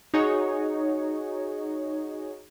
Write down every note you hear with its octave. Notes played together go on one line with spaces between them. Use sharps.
D#4 F#4 G#4 C#5